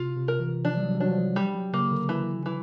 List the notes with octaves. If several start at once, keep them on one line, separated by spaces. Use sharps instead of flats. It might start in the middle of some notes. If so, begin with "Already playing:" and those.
Already playing: C3 F4
C3
A#4
E3
F3 D4
G3
F#3
G3
F#3 D4
F3
F#3
G3
F#3
C#3 A#3
D3
E3
E3